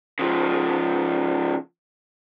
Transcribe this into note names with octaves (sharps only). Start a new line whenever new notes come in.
C#3 F3